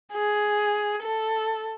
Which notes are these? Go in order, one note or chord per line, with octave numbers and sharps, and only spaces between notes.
G#4
A4